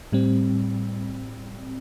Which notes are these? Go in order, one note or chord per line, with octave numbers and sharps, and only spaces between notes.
A2 G3 C4